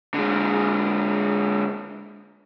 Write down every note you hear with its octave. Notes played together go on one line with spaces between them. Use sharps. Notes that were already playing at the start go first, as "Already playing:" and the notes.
D3 G#3